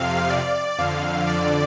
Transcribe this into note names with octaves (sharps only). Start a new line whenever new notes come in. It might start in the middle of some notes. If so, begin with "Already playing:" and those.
Already playing: F2 C3 F5
D5
F2 D3 F5
D5